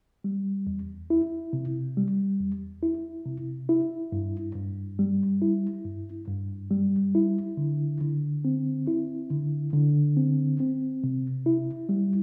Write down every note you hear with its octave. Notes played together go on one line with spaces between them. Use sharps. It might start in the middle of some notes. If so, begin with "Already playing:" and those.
G3
E2
E4
C3
G3
E2
E4
C3
E4
G2
G2
G3
E4
G2
G2
G3
E4
D3
D3
C4
E4
D3
D3
C4
C4
C3
E4
G3